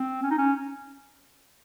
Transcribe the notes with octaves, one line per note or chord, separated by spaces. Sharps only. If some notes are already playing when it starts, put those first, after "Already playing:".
Already playing: C4
C#4
D#4
C#4